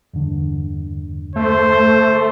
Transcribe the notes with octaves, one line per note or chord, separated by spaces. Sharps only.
E2 G2 D3
A3 C5